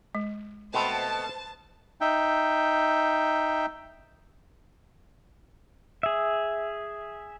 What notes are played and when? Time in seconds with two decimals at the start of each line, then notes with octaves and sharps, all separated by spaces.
0.15 G#3
0.74 B2 A3 B3 C4 C5 A5
2.01 D#4 E5 G5
6.03 G#4 E5